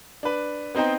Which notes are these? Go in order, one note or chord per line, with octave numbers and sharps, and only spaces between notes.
D4 B4
B3 C4 D#4 C5 G5